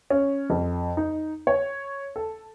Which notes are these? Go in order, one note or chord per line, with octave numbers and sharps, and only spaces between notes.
C#4
F2
D#4
C#5
A4